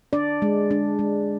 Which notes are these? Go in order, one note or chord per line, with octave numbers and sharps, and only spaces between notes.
D4 D5
G#3
D4
G#3